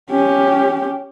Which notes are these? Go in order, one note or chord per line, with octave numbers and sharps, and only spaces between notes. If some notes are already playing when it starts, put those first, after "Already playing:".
C#4 G4